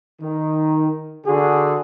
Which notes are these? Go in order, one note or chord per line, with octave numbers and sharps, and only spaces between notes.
D#3
D3 F#4 G#4